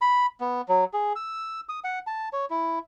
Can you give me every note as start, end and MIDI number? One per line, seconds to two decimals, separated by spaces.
0.01 0.26 83
0.40 0.61 59
0.69 0.84 54
0.93 1.13 68
1.16 1.60 88
1.69 1.80 87
1.84 1.99 78
2.07 2.29 81
2.33 2.45 73
2.50 2.79 64